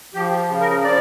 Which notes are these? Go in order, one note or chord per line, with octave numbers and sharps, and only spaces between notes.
F3 G4
C#3
A#4
F3 D5